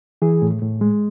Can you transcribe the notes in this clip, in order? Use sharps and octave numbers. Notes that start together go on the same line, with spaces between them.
E3 G#4
A2
A2
G#3